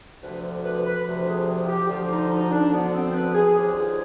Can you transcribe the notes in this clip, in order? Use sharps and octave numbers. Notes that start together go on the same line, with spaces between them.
D2 C3 F3 B4
B4
B4
D2 C3 F3
G#4
G4
F4
G4
D2 D3 F3 F4
D#4
D#4
D4
D2 D3 F3 B3
C4
C5
B4
G#4
D#2 D3 F3 G4
B4
G#4